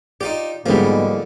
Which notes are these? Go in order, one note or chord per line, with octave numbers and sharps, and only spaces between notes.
D#4 F4 G4 D5
G#2 D3 F3 G3 G#3 A#3 B3